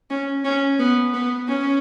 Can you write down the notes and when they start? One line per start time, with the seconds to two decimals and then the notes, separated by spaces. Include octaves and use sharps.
0.10 C#4
0.45 C#4
0.79 B3
1.14 B3
1.48 C#4